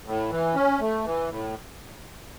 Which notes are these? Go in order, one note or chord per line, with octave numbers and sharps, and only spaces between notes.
A2
E3
C#4
A3
E3
A2